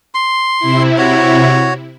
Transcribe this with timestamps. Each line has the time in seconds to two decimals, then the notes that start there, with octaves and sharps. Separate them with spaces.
0.15 C6
0.59 C3 E4
0.98 F#4 C#5